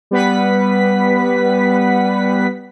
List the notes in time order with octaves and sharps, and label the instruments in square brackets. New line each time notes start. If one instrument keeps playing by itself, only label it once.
[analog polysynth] G3 B3 B4 F#5 B6